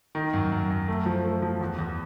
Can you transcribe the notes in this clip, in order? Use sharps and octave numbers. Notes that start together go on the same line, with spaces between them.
D#3
F#2
F#2
F#2
A3
F3
A3
F3
E2
E2